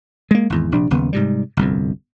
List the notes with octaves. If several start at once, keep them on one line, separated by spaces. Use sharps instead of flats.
G#3 A#3
G#1 E2
A#1 C3 D4
F#1 D#2 C#3 B3
G#2 C3 G3
G1 C2 F2